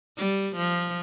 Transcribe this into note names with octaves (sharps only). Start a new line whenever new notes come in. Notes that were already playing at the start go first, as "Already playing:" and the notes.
G3
F3